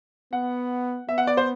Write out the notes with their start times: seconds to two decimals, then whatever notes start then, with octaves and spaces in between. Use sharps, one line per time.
0.33 B3 F#5
1.09 B3 E5
1.18 F#5
1.27 D5
1.37 C5